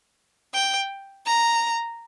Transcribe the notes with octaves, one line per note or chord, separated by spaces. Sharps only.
G5
A#5